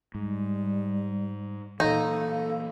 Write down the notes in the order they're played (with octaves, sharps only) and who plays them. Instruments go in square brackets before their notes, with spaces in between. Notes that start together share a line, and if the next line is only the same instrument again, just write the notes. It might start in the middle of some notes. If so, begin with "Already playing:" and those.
[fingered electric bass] G#2 [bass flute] G3
[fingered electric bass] A#2 E3 [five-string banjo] D#4 [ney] A4 [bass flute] F5